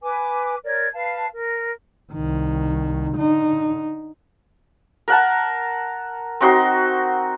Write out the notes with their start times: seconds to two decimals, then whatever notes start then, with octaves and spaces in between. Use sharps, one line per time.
0.02 B4 G#5 D6
0.64 A#4 C#5 D5 G#6
0.93 B4 F5 A5
1.33 A#4
2.13 C2 D#3
3.14 D3 D#4
5.08 A#4 F#5 A5
6.41 C4 D#4 F#4 C6